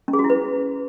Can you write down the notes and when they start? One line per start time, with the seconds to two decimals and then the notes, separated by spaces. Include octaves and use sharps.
0.08 C#4
0.13 G#4
0.19 F#4
0.24 E4
0.30 B4